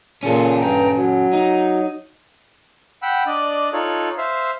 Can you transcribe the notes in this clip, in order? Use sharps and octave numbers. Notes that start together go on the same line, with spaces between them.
A#2 C#3 C#4 A4
G2 G5 A#5
F#3
D#4
F#5 G5 B5 E6
D4 D5 D#5 F#6
D#4 F4 A4 C#5 F#6
C5 E5 F5